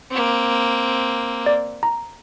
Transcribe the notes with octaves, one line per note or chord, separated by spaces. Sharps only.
A#3 C4
D5
A#5